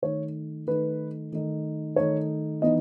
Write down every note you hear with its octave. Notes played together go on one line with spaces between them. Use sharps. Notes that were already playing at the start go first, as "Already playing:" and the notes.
D#3 A3 D#4 C#5
D#3 A3 D#4 B4
D#3 A3 D#4
D#3 A3 D#4 C#5
E3 B3 D#4 D#5